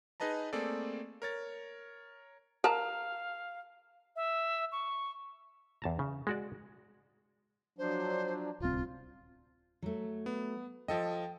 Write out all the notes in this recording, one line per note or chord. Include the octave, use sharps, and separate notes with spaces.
D#4 G#4 B4 D#5 A5 A#5
A3 A#3 C4 G#4 A4 D5
A#4 C#5 A6
A#4 F5 A5 A#5
E5
C#6
E2 A5 A#5
C#3
G#3 F#4 D5
F3 F#3 D4 C5
D1 C2 C4 F4
F#3 A3
B3
F3 A4 D#5 G5